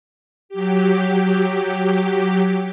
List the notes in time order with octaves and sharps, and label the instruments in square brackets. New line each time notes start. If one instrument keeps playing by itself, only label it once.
[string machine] F#3 G4